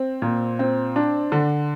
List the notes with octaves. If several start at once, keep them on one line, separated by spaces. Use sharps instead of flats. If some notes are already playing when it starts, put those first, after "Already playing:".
Already playing: C4
A#2
C4
D4
D3